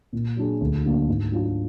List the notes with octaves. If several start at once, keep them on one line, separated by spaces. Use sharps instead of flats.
A#2
F#3 D4 G#4
D2
D3 F#3 A#3 D4
G#2
F#3 D4 F4